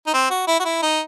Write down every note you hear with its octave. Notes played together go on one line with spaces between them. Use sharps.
D#4
C4
F#4
E4
F#4
E4
D#4